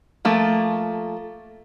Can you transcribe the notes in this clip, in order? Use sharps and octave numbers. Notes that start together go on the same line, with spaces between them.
F3 A3 A#3